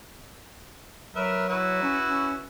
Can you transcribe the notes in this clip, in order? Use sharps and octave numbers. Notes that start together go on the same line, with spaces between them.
F#3 A#4 B4 E5
E4 F#4 B4
C#4
C#4